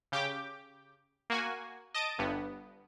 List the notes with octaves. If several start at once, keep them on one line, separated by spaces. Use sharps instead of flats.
C#3 G4 G5 D6
A#3 F#4 G#5
D#5 A5 D#6 D7
G1 G2 B3